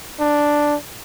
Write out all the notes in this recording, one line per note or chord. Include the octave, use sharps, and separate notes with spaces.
D4